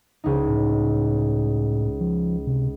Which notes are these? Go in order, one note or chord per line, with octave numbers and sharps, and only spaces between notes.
C#2 D#4
A2
F3
C3